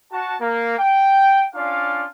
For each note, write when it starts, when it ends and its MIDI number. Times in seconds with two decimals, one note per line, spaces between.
0.12 0.35 66
0.12 0.35 81
0.41 0.76 58
0.79 1.46 79
1.55 2.06 61
1.55 2.06 62
1.55 2.06 65
1.55 2.06 74
1.55 2.06 77